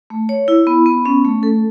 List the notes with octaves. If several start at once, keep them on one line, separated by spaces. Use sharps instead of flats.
A3
C#5
E4
B3
B3
C#4
A3
A4